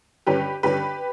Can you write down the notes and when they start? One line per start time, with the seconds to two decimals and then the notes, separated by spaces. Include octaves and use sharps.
0.27 G2 D3 G3 C#4 G4 B4
0.63 G2 D3 G3 C#4 G4 B4